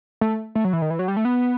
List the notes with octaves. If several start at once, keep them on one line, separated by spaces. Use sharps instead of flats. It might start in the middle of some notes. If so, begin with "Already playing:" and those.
A3
A3
F#3
E3
D#3
E3
F#3
G3
A3
B3